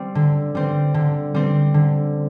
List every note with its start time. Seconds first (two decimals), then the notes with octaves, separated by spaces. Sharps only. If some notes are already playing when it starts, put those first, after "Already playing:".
Already playing: G3 C4
0.15 D3
0.55 G3 C4
0.94 D3
1.34 G3 C4
1.74 D3